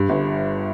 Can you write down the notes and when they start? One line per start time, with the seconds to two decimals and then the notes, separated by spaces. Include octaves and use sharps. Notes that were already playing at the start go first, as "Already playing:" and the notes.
Already playing: G2
0.09 G1